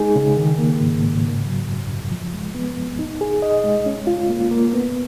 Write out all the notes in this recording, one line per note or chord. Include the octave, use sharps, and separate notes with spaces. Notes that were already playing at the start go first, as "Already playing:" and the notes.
Already playing: G#3 D#4 G#4
C#3
D#3
A#3
G#2
G#2
C#3
F#3
F#2
F#2
F3
G#3
B3
F#2
D#4
G#4
D#5
G#3
C#4
F4
A#3
A#3
B3